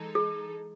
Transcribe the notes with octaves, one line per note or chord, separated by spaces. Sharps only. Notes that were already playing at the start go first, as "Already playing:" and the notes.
Already playing: E3 G#3 D#4 A4
G#4